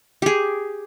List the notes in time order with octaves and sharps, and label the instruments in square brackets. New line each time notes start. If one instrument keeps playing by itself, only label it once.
[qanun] G4 G#4